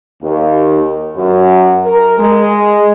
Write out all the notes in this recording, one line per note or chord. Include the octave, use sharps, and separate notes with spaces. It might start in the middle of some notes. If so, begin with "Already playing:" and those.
D#2
F#2
A#4
G#3